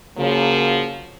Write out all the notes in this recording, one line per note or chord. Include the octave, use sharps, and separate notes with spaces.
C#3 F3 F#3 A#3